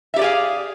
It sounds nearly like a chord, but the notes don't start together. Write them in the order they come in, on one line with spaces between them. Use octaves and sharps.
E5 G4 D5 G#4 F5